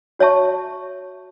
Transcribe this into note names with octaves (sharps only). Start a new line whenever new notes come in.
F#4 C#5 E5 A5 C#6